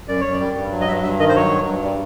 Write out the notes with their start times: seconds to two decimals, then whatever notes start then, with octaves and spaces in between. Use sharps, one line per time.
0.08 F#2 D5
0.21 F#2 C#5
0.33 D5
0.40 G3
0.56 G2
0.71 F#3
0.81 D#5
0.88 G2 E5
1.04 G2 E5
1.19 D#3 D#5
1.29 C5
1.35 F#3 C#5
1.51 G2
1.68 G2
1.83 G3